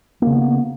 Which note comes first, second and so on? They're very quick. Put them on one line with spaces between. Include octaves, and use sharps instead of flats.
A#3 C#3 B3